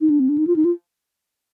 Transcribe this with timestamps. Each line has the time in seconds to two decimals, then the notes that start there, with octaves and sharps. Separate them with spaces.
0.01 D#4
0.10 D4
0.20 C4
0.29 D4
0.38 D#4
0.47 F4
0.56 D#4
0.65 F4